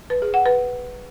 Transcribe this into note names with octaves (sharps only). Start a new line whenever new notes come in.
B4
G#4
F#5
B4